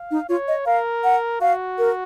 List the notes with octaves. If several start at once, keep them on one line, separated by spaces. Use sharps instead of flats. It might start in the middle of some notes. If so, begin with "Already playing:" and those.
Already playing: F5
D#4
F4 C#5
D#5
A#4 F5
F#5
F#4 F5
A#4